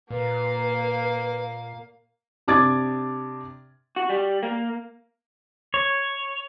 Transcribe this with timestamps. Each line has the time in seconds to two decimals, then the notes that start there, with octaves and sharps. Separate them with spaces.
0.11 A#2 A#3 B4 F5
2.48 C3 D4 D6 D#6 G#6 A6
3.96 F#4
4.10 G3
4.43 A#3
5.74 C#5